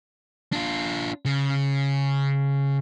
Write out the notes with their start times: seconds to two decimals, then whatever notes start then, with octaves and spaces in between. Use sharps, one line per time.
0.52 D4 F4
1.25 C#3